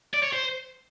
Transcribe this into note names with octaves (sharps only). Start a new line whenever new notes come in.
D5
C#5
C5